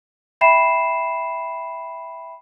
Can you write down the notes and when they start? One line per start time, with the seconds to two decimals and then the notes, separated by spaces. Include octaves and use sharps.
0.41 E5 G5 B5 C7 E7